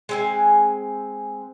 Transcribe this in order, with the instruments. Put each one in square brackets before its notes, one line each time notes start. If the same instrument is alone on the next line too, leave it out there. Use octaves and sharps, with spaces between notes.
[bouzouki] G#3 C4 G#5